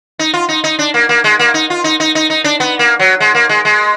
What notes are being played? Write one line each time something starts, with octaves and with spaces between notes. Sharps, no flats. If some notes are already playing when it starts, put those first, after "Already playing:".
D#4
F4
D#4
D#4
D4
A#3
A#3
G#3
A#3
D#4
F4
D#4
D#4
D#4
D#4
D4
B3
A#3
F#3
G#3
A#3
G#3
G#3